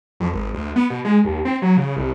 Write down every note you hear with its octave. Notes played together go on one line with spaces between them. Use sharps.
F2
G#1
D2
B3
B2
G#3
D#2
C4
F#3
C#3
C2